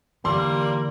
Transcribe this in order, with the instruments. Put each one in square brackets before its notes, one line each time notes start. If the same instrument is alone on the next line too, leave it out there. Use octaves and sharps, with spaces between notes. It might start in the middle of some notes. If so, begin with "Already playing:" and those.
[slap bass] D3 E3 [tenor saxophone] G3 [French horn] A#3 [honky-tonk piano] C6